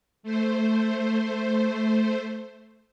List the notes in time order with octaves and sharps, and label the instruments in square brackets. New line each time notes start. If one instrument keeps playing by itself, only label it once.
[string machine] A3 C5